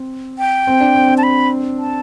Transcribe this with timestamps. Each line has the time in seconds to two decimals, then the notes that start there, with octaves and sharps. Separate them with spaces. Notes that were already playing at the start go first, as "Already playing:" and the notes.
Already playing: C4
0.39 G5
0.67 C4
0.80 D4
0.95 C4
1.08 C4
1.18 A5
1.23 B5
1.79 A5